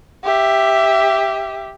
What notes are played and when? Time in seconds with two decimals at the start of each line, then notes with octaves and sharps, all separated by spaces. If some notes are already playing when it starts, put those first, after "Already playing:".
0.24 G4 E5